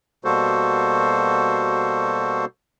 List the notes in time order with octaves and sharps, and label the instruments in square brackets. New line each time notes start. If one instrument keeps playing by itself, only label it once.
[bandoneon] B2 G3 A#3 F#4 A4 C5